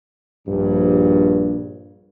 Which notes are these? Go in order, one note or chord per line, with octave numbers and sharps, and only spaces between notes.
A#1 G2